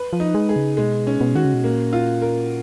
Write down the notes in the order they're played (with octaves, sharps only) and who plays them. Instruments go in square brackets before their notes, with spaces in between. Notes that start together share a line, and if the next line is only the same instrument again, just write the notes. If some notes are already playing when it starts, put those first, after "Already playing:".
Already playing: [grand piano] B4
[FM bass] F3
[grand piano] D#4
[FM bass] G#3
[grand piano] G#4
[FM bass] C#3
[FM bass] B2 [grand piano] G#3
[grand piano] C#4
[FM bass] B2
[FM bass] D#3 [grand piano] F#4
[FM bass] C#3
B2
[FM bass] A#2 [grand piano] A#3
[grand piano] F4
A#4